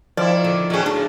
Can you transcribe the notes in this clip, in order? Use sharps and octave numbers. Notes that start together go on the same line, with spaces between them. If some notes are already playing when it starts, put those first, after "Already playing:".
D#3 F3 E4 D5
D3
B2 D#3 F#3 C#4 G#4
A2 D4